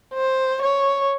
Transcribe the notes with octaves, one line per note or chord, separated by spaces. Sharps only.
C5
C#5